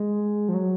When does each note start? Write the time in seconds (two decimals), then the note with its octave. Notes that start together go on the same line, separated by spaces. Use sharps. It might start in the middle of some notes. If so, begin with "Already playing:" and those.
Already playing: G#3
0.49 F3
0.54 F#3